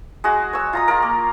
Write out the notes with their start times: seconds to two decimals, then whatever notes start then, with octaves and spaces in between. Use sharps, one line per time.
0.24 G#3 F#4
0.53 C#5 E6
0.73 F4 A#5 D#6
0.88 F4 A#4
1.02 A#3